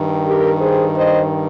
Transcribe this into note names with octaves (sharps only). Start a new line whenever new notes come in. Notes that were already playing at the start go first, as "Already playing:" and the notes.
Already playing: G2 D#3
G4 A#4
G#4 C5
C5 D#5